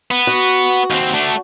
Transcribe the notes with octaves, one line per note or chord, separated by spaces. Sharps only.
B3
F#4
D#2 C4
A3 D4